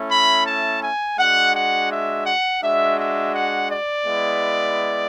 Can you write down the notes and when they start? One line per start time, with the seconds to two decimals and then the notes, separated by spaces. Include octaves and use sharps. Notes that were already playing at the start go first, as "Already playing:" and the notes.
Already playing: A3 C#4 E4
0.11 B5
0.46 A5
0.83 G#5
1.19 G#3 D4 F#4 F#5
1.55 F#5
1.91 E5
2.26 F#5
2.62 G#3 D4 F#4 E5
2.98 E5
3.34 F#5
3.71 D5
4.06 G#3 B3 E4